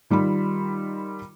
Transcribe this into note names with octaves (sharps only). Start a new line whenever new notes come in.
D#3 G3 F4 B5